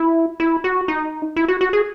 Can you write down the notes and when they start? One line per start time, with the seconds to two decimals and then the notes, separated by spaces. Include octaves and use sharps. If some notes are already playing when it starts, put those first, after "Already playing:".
Already playing: E4
0.40 E4
0.64 F#4
0.88 D#4
1.36 E4
1.48 F#4
1.61 F#4
1.73 G#4